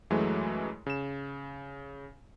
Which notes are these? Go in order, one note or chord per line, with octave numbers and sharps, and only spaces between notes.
F#2 E3 F#3 G#3 A3
C#3 E7